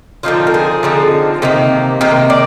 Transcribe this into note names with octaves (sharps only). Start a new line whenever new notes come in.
D3 F3 C4 D#4 F4
A#4
G#4
D3 F3 C4 D#4
C3 D#3 A#3
C3 D#3 A#3 A#4
D5